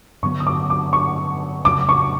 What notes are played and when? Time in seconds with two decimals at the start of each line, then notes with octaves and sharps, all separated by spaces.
0.23 G2 D3 F#3 B3 C#6
0.40 D#6
0.47 D6
0.70 D6
0.93 C#6
1.64 F2 C#3 F#3 D6
1.89 C#6